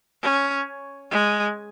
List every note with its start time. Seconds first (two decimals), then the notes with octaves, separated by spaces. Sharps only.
0.23 C#4
1.11 G#3